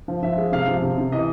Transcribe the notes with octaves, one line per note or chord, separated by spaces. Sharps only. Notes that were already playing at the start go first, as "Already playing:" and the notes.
F3
F3 E5
G#3
C3 F5
F3
C3
C3
E3 D#5